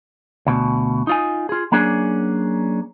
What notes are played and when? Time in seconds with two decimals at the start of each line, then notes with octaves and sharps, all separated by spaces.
0.47 D2 B2
1.07 D#4 F4 G#5
1.49 F4 G#4
1.72 F#3 A#3 C#4 D4 G#4